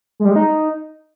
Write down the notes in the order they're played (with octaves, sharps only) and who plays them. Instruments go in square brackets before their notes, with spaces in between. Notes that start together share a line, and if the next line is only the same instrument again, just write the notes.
[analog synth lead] G#3
G3
G#3
D#4